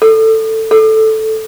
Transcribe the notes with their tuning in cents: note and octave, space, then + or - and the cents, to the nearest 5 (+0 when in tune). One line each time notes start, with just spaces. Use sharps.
A4 +10
A4 -5